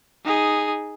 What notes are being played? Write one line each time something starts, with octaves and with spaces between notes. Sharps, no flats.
D#4 G#4